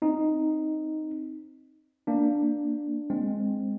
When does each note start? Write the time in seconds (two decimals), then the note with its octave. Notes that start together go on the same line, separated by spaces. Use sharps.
0.02 C4 D#4
2.07 A#3 D4
3.10 G#3 C4